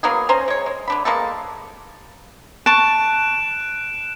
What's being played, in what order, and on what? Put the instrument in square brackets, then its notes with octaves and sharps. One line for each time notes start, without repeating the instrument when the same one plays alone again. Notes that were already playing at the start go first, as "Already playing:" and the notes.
[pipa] F#3 A#3 B3 G#4
C#4 C5 G#5 A#5
G#3 C#5
G#3
D3 D4 B5
G#3 A#3 B3 A4
[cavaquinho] A5 C#6 [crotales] F#6 D7 E7